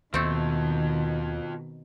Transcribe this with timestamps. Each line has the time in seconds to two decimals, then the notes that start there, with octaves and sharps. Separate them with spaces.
0.14 D#2 B2 D#3 F3 A3 C4 A4